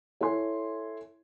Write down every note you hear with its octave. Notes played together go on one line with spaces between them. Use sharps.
E4 A4 C#5 G#5 C6